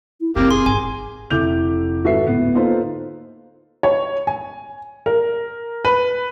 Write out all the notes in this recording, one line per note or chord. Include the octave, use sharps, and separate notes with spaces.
E4
F1 A#2 A#3 C4 G4
G#4 C6
G#1 G#5
F1 E4 A4 D6 G6 F7
G#1 F#4 A4 B4 E5 C7
D1 B3
A#3 D#4 F4 A4 B4 C5
C#5
G#5
A#4
B4